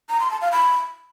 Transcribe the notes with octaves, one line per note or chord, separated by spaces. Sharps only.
A#5
C6
A5
F5
B5